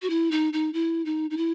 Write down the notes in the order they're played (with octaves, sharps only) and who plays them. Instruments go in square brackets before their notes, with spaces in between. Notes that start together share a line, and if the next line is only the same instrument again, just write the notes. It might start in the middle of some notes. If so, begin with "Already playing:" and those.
[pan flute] F#4
E4
D#4
D#4
E4
D#4
D#4
E4